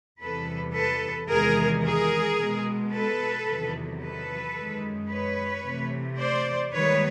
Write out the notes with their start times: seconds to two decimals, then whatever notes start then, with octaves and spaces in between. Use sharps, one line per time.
0.21 E2 C3 E3 G3 A4 B4
0.75 A4 B4
1.29 E2 C3 D#3 G#3 G#4 A#4
1.84 G#4 A#4
2.39 B2 G#3
2.92 A4 B4
3.47 E2 C3 D#3 F#3
4.01 A4 B4
4.56 F#2 D#3 G#3
5.10 B4 C#5
5.64 C3 E3 A3
6.18 C5 D5
6.72 G#2 D#3 G3 A#3 B4 C#5